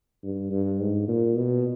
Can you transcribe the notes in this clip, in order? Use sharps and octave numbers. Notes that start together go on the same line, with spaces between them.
G2
G2
G#2
A#2
B2